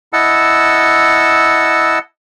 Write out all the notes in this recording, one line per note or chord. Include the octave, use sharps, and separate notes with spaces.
E4 D#5 F#5 A5 E6